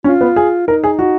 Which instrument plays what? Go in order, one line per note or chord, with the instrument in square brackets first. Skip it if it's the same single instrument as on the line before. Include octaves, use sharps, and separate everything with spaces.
[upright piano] C#4 [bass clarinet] F4
[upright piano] B3
G#4
[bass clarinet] D#4 [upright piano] A#4
[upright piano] G#4
F#4